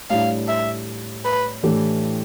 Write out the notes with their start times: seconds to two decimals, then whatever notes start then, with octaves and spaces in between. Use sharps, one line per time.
0.10 A2 G3 D4 F5
0.48 E5
1.25 B4
1.63 A2 E3 A3 D4 G4